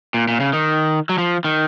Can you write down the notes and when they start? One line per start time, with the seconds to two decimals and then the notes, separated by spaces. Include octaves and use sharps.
0.14 A#2
0.28 A#2
0.40 C#3
0.53 D#3
1.09 F#3
1.18 F3
1.44 D#3